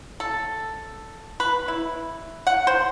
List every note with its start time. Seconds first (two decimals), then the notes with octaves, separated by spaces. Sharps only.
0.20 A4
1.40 B4
1.68 E4
2.47 F#5
2.67 C5